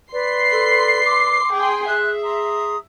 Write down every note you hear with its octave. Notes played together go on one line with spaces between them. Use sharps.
B4 D5 C6 C7
A4
D6
G#4 G5 C6
G#4 E5 F#6
A#5 C6 D#6